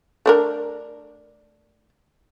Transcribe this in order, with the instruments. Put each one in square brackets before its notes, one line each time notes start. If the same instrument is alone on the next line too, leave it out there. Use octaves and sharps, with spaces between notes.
[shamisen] A3 D4 A#4